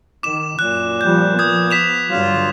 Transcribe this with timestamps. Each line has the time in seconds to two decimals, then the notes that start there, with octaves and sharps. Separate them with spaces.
0.23 D#3 D6 E7
0.59 F#2 A#2 F#6
1.01 F3 G3 G6
1.39 F3 B3 D#6 G6 G#6
1.71 B6 E7 F7
2.10 G2 D3 F#3 F4